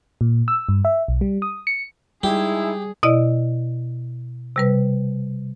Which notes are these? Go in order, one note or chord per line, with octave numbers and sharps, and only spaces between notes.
A#2
E6
G2
E5
B1
G3
D#6
C#7
G3 G#3 D#4 E4 G4 G#4
B2 E4 D5 D#5
C3 G3 B4